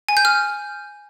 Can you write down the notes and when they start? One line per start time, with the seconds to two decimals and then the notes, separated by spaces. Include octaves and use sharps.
0.09 G#5
0.17 G6
0.25 F6